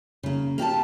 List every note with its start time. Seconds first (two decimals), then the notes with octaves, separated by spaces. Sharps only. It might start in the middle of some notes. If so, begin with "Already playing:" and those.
0.23 C#3 A#3
0.58 A#3 G4 D5 A5